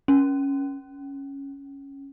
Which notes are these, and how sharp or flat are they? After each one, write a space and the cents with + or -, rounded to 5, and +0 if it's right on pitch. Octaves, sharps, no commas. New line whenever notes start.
C#4 +0